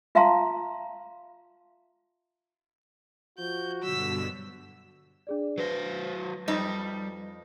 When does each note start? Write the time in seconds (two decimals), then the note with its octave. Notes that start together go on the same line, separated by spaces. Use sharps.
0.15 F4 E5 F5 A5 A#5 C6
3.39 F3 F#4 G6
3.83 G2 B2 D3 F#3 E6 B6
5.27 D4 G#4 D5
5.58 F#3 B4 C5 A#6
6.48 F2 G3 D#4